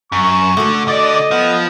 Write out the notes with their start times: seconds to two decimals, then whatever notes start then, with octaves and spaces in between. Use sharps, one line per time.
0.12 F#2 C#6
0.57 D3 A3 F#4
0.88 D3 D5 D#5
1.31 F3 B3